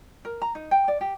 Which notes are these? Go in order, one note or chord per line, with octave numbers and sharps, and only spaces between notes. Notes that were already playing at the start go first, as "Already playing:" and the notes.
A#4
A#5
D#4
G5
D5
G4